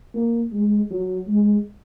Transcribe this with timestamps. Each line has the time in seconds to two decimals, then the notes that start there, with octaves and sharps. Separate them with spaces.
0.14 A#3
0.52 G#3
0.90 F#3
1.28 G#3